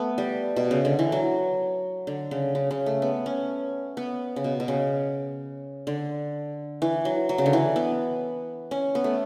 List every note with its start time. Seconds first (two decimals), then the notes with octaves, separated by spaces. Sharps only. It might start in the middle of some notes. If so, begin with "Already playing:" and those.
Already playing: A3 B3
0.18 G3
0.56 B2
0.71 C#3
0.85 D3
0.99 E3
1.12 F#3
2.07 D3
2.31 C#3
2.55 C#3
2.71 C#3
2.86 A3
3.02 B3
3.26 C#4
3.97 B3
4.36 C#3
4.44 B2
4.60 B2
4.68 C#3
5.87 D3
6.82 E3
7.05 F#3
7.29 F#3
7.38 C#3
7.46 D3
7.53 E3
7.76 B3
8.71 C#4
8.95 B3
9.04 A3